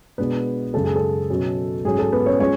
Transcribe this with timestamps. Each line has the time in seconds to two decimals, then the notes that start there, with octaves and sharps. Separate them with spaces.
0.18 B2 G#3 B3 D4 B4
0.74 F#2 C#3 G#3 A4
0.85 G#4
0.96 A4
1.30 B2 F#3 C#4
1.84 G#2 F#3 C#4 G#4
1.99 A4
2.12 B3 B4
2.26 C#4 C#5
2.40 F3 G#3 C#4 C#5